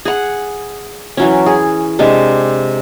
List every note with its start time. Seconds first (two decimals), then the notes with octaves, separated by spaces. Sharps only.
0.05 G#4 F#5
1.17 E3 F#3 C#4
1.46 G#4
1.99 C3 G#3 D4